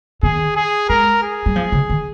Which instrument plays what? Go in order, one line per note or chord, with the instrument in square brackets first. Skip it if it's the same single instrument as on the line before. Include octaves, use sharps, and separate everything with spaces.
[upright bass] D#3 [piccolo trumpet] G#4
[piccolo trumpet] G#4
[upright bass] G#3 [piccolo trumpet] A#4
[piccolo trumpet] G#4
[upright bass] G3
F3
C#3
D#3